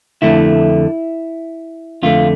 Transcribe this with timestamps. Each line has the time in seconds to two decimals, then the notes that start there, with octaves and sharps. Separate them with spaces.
0.22 F2 D3 A3 E4
2.03 F2 D3 A3 F4